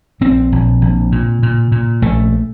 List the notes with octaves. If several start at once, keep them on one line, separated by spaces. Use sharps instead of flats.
A#1 C4
A#1
A#1
A#2
A#2
A#2
A#1 A3